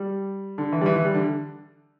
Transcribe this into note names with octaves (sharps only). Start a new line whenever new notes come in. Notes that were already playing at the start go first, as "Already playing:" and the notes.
Already playing: G3
D3
E3
G3
E3
E3
G3
D3